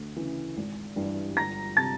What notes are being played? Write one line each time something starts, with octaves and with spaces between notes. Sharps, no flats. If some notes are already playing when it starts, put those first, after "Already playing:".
Already playing: D2
C#3 E3
G#1
G2 E3 G3
G1 A#5 A#6
C3 A5 A6